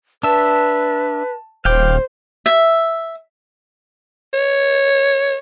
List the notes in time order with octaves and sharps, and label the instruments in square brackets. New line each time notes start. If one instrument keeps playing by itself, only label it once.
[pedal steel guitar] D4 E5 [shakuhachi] B4 [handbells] A5
[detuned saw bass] D#1 [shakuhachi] C5 [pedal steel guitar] F5 G5 D6
[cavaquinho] E5
[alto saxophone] C#5